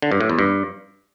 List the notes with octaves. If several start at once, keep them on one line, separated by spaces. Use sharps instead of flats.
D3
G2
A2
E2
G2